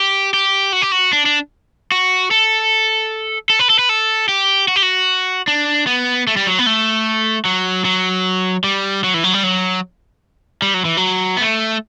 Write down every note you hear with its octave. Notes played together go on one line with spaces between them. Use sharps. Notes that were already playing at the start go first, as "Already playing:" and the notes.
Already playing: G4
G4
F#4
G4
F#4
D4
D4
F#4
A4
A4
B4
A4
B4
A4
G4
F#4
G4
F#4
D4
B3
A3
G3
F#3
B3
A3
F#3
F#3
G3
F#3
E3
F#3
G3
F#3
G3
F#3
E3
F#3
B3
A3